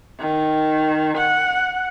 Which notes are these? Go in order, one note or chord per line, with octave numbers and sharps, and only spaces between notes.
D#3
F#5